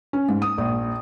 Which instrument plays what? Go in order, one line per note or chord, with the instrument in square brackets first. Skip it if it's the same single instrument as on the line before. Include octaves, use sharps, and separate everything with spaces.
[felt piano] C#4
G#2
D#6
A#1